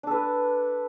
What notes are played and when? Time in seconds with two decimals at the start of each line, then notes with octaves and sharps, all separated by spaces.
0.03 D4
0.07 A4
0.11 B4